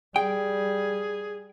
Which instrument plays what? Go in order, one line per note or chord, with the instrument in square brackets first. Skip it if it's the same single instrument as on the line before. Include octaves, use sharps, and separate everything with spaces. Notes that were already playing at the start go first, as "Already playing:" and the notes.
[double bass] G3 [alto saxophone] G#4 [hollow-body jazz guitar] G5